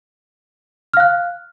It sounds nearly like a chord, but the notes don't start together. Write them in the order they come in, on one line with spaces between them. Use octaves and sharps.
F6 F5 F#6